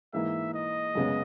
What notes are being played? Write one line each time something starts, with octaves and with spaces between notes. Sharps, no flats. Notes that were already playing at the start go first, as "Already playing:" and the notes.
G#2 E3 A#3 E4 E5
D#5
F#2 C#3 G#3 B3